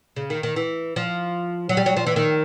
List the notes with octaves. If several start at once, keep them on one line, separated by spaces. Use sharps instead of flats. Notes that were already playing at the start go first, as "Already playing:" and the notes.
C#3
D#3
D#3
E3
F3
F#3
G3
F#3
F3
E3
D#3